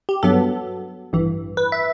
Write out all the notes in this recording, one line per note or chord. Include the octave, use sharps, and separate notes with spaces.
G4
G2 F#3 B3 A4
A1 G2 E3
B4
E5